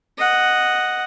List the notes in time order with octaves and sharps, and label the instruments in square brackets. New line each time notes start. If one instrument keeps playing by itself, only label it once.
[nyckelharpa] D#5 F#5